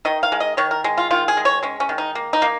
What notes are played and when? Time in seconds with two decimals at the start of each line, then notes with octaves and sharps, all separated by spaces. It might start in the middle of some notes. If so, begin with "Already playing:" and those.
0.05 D#3 D#5
0.23 F5
0.32 G#3
0.40 D#5
0.57 D#3 C#5
0.71 A#4
0.84 G#3
0.98 F4
1.11 D#3 F4
1.28 G#4
1.37 G#3
1.45 C#5
1.63 G#3 C#4
1.80 C#4
1.89 D#3
1.98 D#4
2.15 A#3
2.33 D#4
2.42 A#3